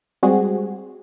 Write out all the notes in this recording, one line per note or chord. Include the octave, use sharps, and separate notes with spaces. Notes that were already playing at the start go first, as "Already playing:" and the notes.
G3 G#3 C4 F#4 G#4